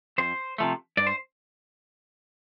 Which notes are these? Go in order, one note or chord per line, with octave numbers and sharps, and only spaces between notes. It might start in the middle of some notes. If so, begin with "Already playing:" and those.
F2 C5
C3 F3 A3
G2 D5
C5